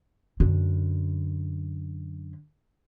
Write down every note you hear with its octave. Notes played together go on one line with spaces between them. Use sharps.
F#2 D3